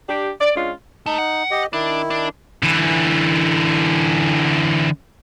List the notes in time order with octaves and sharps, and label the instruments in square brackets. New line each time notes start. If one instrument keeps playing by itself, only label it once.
[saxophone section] D4 G4
D5
G#3 C#4 D4 F4
[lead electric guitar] A3 [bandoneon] D#4
[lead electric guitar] F#5
[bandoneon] G4 D#5
[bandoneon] D#3 E4 [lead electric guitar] D4
[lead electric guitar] D4
[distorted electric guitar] D3 E3